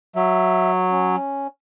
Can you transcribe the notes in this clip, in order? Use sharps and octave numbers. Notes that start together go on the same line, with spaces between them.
F#3 E5
C#4